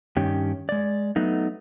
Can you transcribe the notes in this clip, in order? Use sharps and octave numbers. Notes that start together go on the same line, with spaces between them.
G2 D#3 C#4 G4
G#3 D5
F#3 A3 B3 D#4